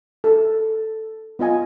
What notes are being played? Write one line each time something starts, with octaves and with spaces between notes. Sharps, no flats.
A4
B3 F4 D#5 G#5